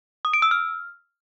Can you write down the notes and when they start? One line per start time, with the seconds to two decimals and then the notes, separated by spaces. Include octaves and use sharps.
0.25 D#6
0.34 D7
0.42 E6
0.51 F6